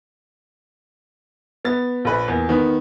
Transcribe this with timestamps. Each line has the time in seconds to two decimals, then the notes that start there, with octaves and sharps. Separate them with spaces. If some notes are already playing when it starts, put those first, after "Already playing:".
1.65 B3 A6
2.05 A#1 B4
2.28 E2 A#3
2.49 D#3 B3